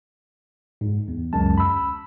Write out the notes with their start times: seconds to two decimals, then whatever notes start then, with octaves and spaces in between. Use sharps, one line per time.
0.81 G#2
1.08 E2
1.33 C#2 F#2 G#3 A5
1.58 B5 E6